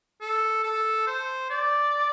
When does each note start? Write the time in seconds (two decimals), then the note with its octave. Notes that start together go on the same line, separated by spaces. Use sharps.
0.21 A4
0.64 A4
1.07 C5
1.50 D5